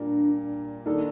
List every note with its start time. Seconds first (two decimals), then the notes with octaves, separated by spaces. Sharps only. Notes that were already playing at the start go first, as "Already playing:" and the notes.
Already playing: A#2 G3 A#3 D4
0.86 D#3 A#3 D4 D#4 A4